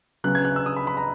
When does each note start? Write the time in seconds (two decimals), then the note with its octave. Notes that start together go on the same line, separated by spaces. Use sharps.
0.24 C#3 F#3 B3 F#6
0.35 G#6
0.45 F#6
0.56 E6
0.66 D#6
0.76 B5
0.87 B5
0.97 A#5